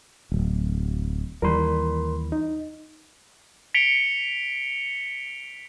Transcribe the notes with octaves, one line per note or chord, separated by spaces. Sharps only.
D1
D#2 E3 G3 A#4 B5 C6
D#4
B6 C#7 D7 F7 G7